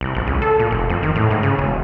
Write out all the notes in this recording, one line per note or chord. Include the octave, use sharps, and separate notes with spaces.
C2
A#1
C#2
A4
A#2
F1
F2
D#3
A2
G#2
C#3
E1